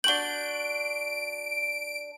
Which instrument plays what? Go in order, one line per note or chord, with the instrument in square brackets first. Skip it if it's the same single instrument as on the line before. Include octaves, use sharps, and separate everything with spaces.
[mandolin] D4 F#4 G6 [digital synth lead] D7 [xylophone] F#7 G7